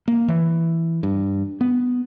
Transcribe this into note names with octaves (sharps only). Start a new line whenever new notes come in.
A#3
E3
G2
B3